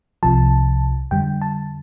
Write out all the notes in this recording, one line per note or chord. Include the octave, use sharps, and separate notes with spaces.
C2 C3 F3 A5
F2 D3 G3 G5
A5